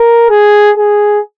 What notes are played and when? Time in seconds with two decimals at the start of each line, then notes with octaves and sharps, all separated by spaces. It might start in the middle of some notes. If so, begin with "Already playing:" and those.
Already playing: A#4
0.30 G#4
0.77 G#4